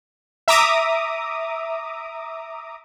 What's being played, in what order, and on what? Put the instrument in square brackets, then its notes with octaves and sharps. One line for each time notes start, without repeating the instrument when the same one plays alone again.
[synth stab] E5 A#5 D6 D#6